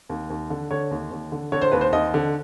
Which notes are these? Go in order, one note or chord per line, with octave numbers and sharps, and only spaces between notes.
D#2
D#2
D3
D3 C#5
D#2
D#2
D3
D3 C#5
C5
D#2 B4
C5
D#2 D#5
D3